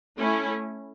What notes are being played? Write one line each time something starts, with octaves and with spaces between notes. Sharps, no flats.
A3 C#4 E4